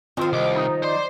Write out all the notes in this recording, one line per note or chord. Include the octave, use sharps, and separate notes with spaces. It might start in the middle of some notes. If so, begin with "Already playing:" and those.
D#3 F3 C4 F4
C2 D#5 D6
D#4
C5 D5 C6